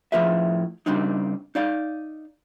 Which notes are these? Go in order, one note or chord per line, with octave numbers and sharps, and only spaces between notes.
A2 F3 F4 G#4 B4 E5
C#3 G3 C4 D4 D#4
D#4 D5 F5